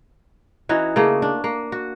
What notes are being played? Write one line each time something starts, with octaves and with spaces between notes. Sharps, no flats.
E3 C#4 D#4 F#4
C#3 A3 A#3
D4
A#3
F#4